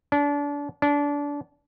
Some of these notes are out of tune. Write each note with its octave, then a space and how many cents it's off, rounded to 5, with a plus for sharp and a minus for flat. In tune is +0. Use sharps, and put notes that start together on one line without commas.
D4 -30
D4 -25